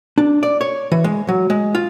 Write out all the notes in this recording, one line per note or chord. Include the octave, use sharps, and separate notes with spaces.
D4
D5
C#5
E3
G#3
F#3
G#3
F4